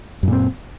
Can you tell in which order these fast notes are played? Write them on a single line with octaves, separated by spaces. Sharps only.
F#2 A#2 C4